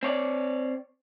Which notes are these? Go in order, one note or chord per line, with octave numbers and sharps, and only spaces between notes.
C4 C#5 D5